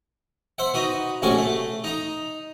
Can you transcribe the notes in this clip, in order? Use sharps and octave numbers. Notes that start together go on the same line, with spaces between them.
C5 E5 F#5
D#4 F#4 B4
A#1 A2 C3 C#4 F#4 C#6
A3
D#4 A#5